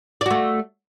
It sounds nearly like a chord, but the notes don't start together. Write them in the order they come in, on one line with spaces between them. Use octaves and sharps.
D5 F#4 A3